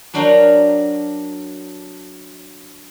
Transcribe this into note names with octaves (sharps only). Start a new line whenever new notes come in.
F#3 D4 F#4 A#4 F5 G5